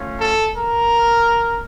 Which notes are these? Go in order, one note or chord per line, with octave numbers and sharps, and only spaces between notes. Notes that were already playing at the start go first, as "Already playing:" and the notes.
Already playing: A3 C#4 F4
A4
A#4